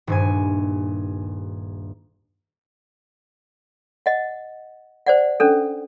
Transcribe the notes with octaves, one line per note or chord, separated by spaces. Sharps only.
D#1 G2 G#5
D#5 F#5
C5 D5 F#5
C#4 D4 A4